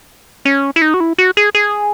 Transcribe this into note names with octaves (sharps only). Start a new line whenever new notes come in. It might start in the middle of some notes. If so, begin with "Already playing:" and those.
C#4
E4
D#4
F#4
E4
F#4
G#4
G#4